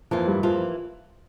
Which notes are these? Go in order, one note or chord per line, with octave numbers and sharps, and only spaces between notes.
F2 E3 F3 A#3 F4
G2 G3
F2 E3 F3 A#3 F4
F3